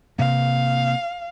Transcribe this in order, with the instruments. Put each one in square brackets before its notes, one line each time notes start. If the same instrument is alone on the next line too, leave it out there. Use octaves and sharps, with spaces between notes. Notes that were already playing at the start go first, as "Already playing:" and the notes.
[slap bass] C3 A#3 [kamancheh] F5